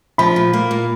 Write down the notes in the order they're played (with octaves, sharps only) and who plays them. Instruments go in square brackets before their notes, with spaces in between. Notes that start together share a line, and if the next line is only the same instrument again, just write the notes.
[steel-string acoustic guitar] F3 [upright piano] B5
[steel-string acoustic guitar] A#2
A#3
A#2